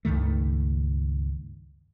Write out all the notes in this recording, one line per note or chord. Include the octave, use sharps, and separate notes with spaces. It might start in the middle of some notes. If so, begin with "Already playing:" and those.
C#2 G2 D#3 A3